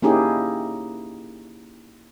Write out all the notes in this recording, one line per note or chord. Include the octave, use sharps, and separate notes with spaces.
A#3 C#4 D#4 E4 G4 G#4